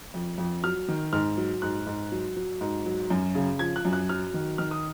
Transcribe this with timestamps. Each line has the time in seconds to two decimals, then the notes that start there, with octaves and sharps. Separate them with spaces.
0.14 F2
0.38 F2
0.64 F#3 F6
0.88 D#3
1.13 G#2 F6
1.37 F#3
1.62 G#2 F#6
1.86 G#2
2.12 F#3
2.36 F#3
2.61 G#2
2.86 F#3
3.10 F#2
3.35 C#3
3.59 F3 G#6
3.76 F#6
3.85 F#2
3.93 F#6
4.09 F#3 F6
4.34 D#3
4.58 D#3 F6
4.71 D#6